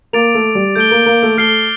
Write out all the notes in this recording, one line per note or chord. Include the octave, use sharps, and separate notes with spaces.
A#3 D6 A6 D7 F7
A3
G3
A3 G6 D7 G7
A#3
A#3
A3
A3 F6 C7 G7